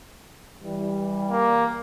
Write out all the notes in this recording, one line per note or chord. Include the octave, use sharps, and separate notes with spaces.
E3 G3
A#3